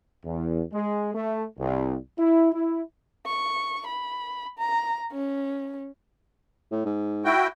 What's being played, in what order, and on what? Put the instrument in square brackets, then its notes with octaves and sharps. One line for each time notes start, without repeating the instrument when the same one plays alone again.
[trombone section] E2
G#3
A3
C2
E4
E4
[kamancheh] C#6
B5
A#5
C#4
[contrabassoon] A2
G#2
[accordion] E4 F#4 G5